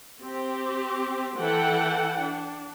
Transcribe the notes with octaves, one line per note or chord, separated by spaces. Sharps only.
C4 G4
E3 A4 F#5 G5
D4